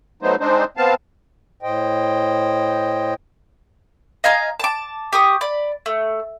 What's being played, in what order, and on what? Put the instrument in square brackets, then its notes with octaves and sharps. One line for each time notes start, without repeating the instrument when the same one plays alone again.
[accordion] F#3 A3 B3 D#4 C5
G#3 C4 D4 D#4 C5
B3 C4 F5 A5
[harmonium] A2 C5 D#5 G5
[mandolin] D#5 F5 G#5 A#5
A5 D6
G4 C#6 D#6
D5 B5
A3